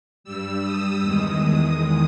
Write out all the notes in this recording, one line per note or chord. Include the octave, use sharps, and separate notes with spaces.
G2 G3 E6
D#6
E2 D#3 G#3